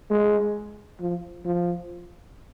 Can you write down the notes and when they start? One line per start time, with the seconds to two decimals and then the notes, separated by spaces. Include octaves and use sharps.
0.10 G#3
1.00 F3
1.45 F3